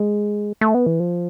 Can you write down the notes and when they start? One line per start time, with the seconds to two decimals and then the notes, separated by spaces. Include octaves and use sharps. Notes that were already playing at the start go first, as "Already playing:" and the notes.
Already playing: G#3
0.61 A3
0.75 B3
0.86 E3
1.00 F3